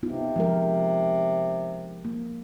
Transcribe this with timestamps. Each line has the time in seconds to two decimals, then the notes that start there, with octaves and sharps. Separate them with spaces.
0.03 C3 B3 D#4 F4
0.36 F3 G#3 A#4
2.05 A#3